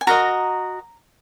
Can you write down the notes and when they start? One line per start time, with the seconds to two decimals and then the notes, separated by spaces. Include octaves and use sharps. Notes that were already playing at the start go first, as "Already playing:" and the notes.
0.01 G#5
0.07 F#4 A#4 D#5 A#5